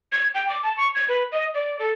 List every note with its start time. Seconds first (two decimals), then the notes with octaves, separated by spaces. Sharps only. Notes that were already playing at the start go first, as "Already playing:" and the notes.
0.12 G#6
0.34 G5
0.49 D6
0.63 A5
0.77 C#6
0.95 G#6
1.09 B4
1.32 D#5
1.54 D5
1.79 A4